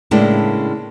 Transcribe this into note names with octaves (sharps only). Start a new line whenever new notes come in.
A2 C#3 G#3 A#3 D4 E4